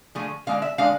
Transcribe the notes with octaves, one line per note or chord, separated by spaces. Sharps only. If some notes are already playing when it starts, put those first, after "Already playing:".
D3 F3 A3 G#4
D3 G#3 D4 F5
E5
D3 G#3 D4 F5